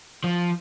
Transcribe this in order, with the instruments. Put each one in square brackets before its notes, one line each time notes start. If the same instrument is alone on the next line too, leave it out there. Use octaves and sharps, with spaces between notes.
[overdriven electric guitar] F3